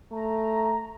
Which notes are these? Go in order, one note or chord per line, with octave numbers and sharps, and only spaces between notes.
A3 A#5